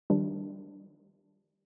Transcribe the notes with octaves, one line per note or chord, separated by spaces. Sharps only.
D#3 F3 G3 D4